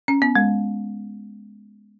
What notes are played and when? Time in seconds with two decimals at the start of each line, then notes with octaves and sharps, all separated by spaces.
0.08 C#4
0.22 B3
0.35 G#3